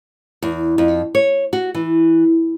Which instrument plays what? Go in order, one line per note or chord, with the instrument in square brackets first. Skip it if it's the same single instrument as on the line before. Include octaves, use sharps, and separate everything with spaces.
[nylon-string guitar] E2
F2
C#5
F#4
E3